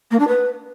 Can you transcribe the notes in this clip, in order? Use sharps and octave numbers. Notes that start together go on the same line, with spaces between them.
A#3
D4
B4